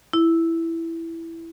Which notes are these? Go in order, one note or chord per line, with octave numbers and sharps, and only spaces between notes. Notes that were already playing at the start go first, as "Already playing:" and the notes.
E4